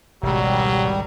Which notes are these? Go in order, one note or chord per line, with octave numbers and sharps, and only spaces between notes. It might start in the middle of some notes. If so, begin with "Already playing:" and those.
G#1 C#2 B2 F#3 G3